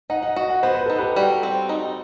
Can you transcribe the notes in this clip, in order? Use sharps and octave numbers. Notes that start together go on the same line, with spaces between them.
D#4 D#5 F#5
D#5 F#5
F#4 D#5 F#5
D#5 F#5
B3 C5
B4
D#4 A4
G4 B4
G3 F#4 A4
C4
D#4